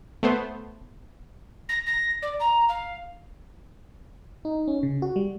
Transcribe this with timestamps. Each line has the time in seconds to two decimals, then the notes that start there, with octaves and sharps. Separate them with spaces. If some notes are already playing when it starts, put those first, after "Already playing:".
0.23 A3 B3 C5
1.69 A#6
1.86 A#6
2.22 D5
2.39 A#5
2.68 F5
4.45 D#4
4.68 C#4
4.83 C#3
5.02 F#4
5.16 G3